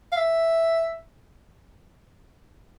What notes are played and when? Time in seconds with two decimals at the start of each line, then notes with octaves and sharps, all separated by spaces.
0.12 F5
0.17 E5